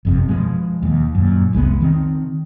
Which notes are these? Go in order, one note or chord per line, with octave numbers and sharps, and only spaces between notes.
G1 F2 C3
B2 F3 G#3
D#2
F#2 A#2
F1 C2 G#3 B3
D3 D#3 C4